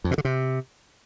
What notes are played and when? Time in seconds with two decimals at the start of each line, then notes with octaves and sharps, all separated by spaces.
0.04 F2
0.11 B2
0.18 D3
0.25 C3